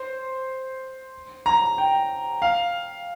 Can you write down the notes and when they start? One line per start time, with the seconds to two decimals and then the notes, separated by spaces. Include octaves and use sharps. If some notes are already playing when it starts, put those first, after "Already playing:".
Already playing: C5
1.46 A#5
1.78 G5
2.42 F5